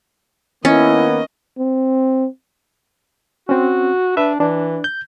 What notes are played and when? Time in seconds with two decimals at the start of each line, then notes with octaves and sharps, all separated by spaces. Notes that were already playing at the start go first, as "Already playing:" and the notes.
0.65 D#3 A#3 B3 C#4 E4 D#5
1.58 C4
3.49 C4 C#4 F#4
4.17 D4 B4 E5
4.40 E3 D4
4.84 G6